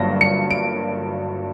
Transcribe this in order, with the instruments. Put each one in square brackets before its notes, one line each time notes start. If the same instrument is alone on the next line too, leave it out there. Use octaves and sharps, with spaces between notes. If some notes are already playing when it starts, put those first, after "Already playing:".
Already playing: [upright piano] G1 G2 F#3 A#3 A#6
C#7
D7